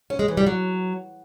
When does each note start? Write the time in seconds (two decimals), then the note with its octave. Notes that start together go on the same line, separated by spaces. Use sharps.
0.10 C#4
0.19 G#3
0.28 E3
0.37 G3
0.47 F#3